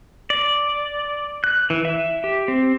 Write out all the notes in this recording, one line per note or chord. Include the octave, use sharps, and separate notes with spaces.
D5
F#6
E3
E5
G4
C4